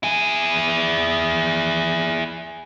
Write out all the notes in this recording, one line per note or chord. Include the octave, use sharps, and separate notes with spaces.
E4 G#4